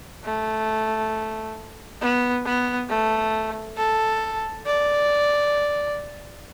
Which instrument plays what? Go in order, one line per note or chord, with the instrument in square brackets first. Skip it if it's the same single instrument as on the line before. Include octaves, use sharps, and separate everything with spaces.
[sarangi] A3
B3
B3
A3
A4
D5